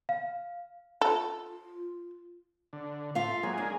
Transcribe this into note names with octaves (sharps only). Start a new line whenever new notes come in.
F5
F4 A4
D3
A2 F4 E5 F5
F#3 G#3 A#3 G#4
D4